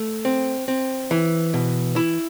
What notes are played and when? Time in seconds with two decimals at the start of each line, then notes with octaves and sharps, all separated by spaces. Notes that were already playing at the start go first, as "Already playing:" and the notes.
Already playing: A3
0.25 C4
0.68 C4
1.11 E3
1.54 B2
1.96 E4